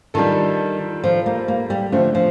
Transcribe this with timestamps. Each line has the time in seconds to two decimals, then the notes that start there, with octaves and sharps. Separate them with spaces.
0.14 D#3 G3 D4 F4 A4
1.04 F3
1.26 A#3
1.48 A#3
1.70 G3
1.92 D3 F3 A3 C4
2.15 F3